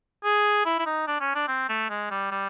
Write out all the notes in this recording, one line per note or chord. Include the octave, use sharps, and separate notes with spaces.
G#4
E4
E4
D#4
D4
C#4
D4
C4
A3
G#3
G3
G3